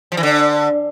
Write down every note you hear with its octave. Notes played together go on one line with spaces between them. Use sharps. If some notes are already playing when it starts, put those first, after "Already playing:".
F3
E3
D3